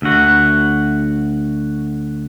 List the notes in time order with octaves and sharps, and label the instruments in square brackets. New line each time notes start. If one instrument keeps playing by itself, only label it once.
[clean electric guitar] D2 F#4